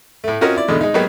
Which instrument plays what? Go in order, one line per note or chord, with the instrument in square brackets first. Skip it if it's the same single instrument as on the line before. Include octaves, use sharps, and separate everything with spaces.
[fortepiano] A2 A3
C4 C#4 F4 F#4 A#4 D#5
E4 D5
E2 G#2 B2 D3
G#3 D#4
F#3 G#3 A#3 B3 G4